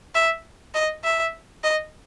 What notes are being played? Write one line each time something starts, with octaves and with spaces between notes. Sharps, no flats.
E5
D#5
E5
D#5